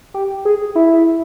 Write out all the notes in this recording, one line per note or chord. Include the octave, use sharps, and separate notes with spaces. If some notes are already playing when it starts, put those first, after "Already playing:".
G4
G#4
E4